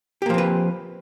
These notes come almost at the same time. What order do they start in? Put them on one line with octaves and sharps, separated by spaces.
G4 A#3 F3 C4 B4